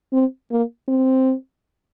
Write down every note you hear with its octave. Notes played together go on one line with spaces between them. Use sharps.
C4
A#3
C4